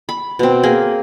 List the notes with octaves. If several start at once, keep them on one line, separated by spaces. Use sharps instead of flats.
B5
B2 C4
A#3 G#4